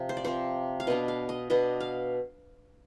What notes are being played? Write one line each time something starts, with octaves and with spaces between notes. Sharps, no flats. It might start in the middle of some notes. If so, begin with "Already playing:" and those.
Already playing: C3 F3 C4
C5
D5
C3 F3 C4 C5
F5
B2 B3 D4 D#5
F5
D#5
B2 B3 D4 D#5
F5